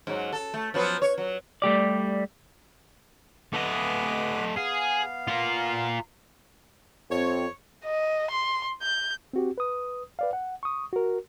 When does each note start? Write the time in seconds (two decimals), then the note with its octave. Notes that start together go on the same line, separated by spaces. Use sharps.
0.07 G#2 F#3
0.33 A4
0.54 A3
0.74 F3 F#3 B3
1.02 C#5
1.18 F#3
1.62 G3 A3 G4 D5
3.54 A3 B3 B4 D#5 D6
4.56 B3 G#4 F5
5.28 F4 A#4
7.11 F2 C4 C#5
7.85 D#5
8.31 C6
8.82 G6
9.33 C4 F#4 G4
9.58 B4 D#6
10.19 B4 D5 F5
10.33 F#5
10.63 C#6 D#6
10.93 F#4 A#4